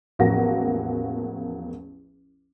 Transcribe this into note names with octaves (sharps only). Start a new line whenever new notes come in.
A1 E2 F3 A#3 F#4 A#6